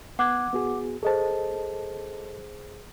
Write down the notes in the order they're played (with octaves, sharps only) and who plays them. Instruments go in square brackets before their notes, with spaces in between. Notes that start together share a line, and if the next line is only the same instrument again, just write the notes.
[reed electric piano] B3 F#6 G#6 [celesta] F#5 D6
[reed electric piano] B3 F#4 G#4
[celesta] G#4 C5 [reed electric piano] A4 D#5 A5